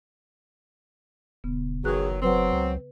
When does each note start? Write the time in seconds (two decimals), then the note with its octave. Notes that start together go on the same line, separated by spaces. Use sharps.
1.44 D#1 C#3 B3
1.84 F#1 D#3 E3 F#3 G#4 B4 F#6
2.22 F#3 C4 B4
2.53 C#2